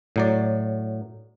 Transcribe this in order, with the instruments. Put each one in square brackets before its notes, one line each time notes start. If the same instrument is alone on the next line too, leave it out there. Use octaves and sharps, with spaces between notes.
[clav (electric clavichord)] A2 F#3 D5